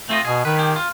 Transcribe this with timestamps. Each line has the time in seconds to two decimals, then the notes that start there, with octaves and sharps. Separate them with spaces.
0.09 A3 C4 F4 D#5
0.25 B2 G#4
0.45 D#3 B4
0.57 G4 G#4
0.76 F4